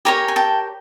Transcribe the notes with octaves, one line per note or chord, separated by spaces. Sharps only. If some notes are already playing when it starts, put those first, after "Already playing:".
G4 A#4 C#5 G#5 A#5
G#5
G5 A5